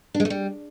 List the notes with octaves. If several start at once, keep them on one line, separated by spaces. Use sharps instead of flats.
D4
G#3
A3
G3